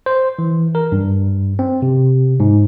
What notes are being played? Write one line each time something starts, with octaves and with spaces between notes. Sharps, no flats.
C5
E3
A#4
G2
C4
C3
G#2